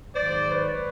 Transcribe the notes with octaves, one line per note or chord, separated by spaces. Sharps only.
G#2 D#3 F#3 C5 D5
B4 C#5